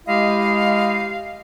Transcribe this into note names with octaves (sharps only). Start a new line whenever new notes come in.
G#3 E4 G4 D#5 F5